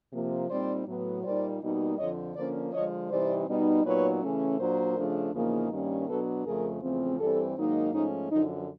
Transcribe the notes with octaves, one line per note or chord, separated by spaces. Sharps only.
C3 F3 A#3
A#2 G3 C4 D#4 C5 D5
A2 F#3 B3
A#2 G3 A#3 D#4 C5 D5
B2 G3 A#3 D#4
F2 D3 F3 C#5 D#5
D3 F3 A#3 C#4 C5 D5
D3 F3 G#3 C#5 D#5
C3 E3 G3 C4 D#4 C5 D5
B2 G3 B3 D#4
A#2 F#3 B3 D#4 B4 C#5
C#3 E3 A3 C#4
A#2 F#3 A#3 D4 A#4 C5
C#3 F3 A3 D4
E2 C#3 F3 A#3 D#4
G2 D#3 G3 A#3 C#4
B2 F#3 B3 D4 A4 B4
F2 C#3 F3 A3 G#4 A#4
E2 C#3 F3 A3 C4
G2 E3 G3 C4 G4 A4
G#2 D#3 F#3 A#3 D#4
G#2 F3 A3 C#4 D#4
F#2 D3 F3 D#4